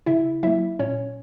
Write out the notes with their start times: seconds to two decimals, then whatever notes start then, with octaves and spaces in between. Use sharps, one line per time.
0.06 C#3 E4 E5
0.43 F#3 A#3 E4 E5
0.79 A#2 C#4 C#5